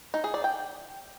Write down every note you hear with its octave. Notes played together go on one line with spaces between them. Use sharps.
D#4
G#4
D5
G5